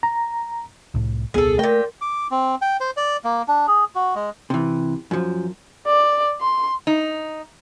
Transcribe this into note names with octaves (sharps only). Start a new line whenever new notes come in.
A#5
C2 A2
D#1 C2 B3 G#4 A4
A#2 A3 A#4 G5
D6
C4
G5
C5
D5
A#3
D4
G#4
F#4
G#3
C3 E3
F#2 F3
D5
C6
D#4